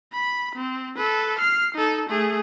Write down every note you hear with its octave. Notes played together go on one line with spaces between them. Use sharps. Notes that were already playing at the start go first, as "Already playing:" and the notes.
B5
C4
A4 B4
F6 C7
D#4 A4
A3 G#4